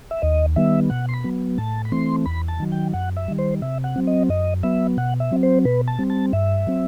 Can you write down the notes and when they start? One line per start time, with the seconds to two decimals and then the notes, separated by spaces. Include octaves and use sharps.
0.11 E5
0.22 D#2 D#5
0.56 D#3 G3 B3 E5
0.90 B2 F#5
1.09 C6
1.13 B5
1.24 F#3 B3
1.58 A2 A5
1.85 B5
1.92 E3 A3 C4 C6
2.26 E2 B5
2.48 A5
2.60 D#3 F#3
2.72 G5
2.94 F#2 F#5
3.17 E5
3.28 D#3 G3
3.39 C5
3.62 C3 E5
3.84 F#5
3.96 F#3 C4
4.07 D#5
4.29 F#2 D#5
4.63 F#3 B3 E5
4.97 B2 F#5
5.20 E5
5.32 F#3 C4
5.43 C5
5.65 B2 B4
5.88 A5
5.99 G3 C4
6.10 A5
6.33 G2 E5
6.67 F#3 C4